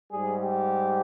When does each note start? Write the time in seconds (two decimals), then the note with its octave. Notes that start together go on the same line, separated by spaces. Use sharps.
0.11 G#2 G3 G#4
0.40 G4